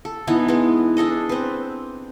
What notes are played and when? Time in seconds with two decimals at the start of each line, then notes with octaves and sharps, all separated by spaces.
0.05 A4
0.27 E3 B3 D#4
0.48 G#3 B3
0.97 D4 G#4 A4 D#5
1.29 C4 B4